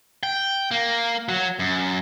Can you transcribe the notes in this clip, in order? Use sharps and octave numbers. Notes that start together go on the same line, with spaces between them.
G5
A#3
F#3
F#2